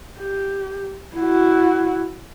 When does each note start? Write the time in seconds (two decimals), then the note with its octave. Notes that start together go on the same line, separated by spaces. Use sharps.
0.17 G4
1.16 E4 F#4